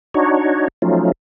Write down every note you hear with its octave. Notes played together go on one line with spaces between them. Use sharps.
D4 D#4 F#4 C#5
F3 F#3 A3 C#4 D#4 F4